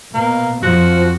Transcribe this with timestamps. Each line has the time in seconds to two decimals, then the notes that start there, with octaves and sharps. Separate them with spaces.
0.14 B2 A#3
0.63 F2 F3 F#4